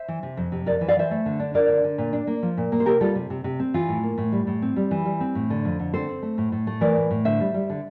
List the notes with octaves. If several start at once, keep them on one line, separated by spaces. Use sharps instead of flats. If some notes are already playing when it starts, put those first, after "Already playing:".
Already playing: C5 E5
E3
C3
F2
C3
F2 A#4 D5
E3
D5 F5
E3 C5 E5
A3
D3
D4
D4 A#4 D5
D3
D3
A#2
D4
A#3
F3
A#2
A#3
C5
C3 G4 A#4
G3 F4 A4
C3
C3
C3
C4
E3 F4
A2
A#3
A2
G3
A2
C4
G3
E3
G3
C4
A2
D3
F2
D3
C4 A4 C5
C4
A3
A2
A2
A3
E3 A#4 D5
A2
A2
D3 C5 E5
G3
G3
D3